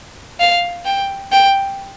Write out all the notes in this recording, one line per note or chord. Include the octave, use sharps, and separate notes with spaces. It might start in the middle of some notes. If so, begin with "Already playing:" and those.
F5
G5
G5